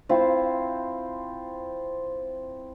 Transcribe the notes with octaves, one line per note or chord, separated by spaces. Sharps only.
C4 E4 F4 C5